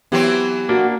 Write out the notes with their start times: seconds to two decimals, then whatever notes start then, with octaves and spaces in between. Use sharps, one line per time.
0.12 E3 F#3 B3 C4 G4
0.69 A#3 D4 F#4